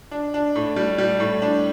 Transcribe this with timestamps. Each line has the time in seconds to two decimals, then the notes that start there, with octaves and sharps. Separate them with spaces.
0.11 D4
0.34 D4
0.55 A2
0.76 G3
0.98 G3
1.20 A2
1.42 D4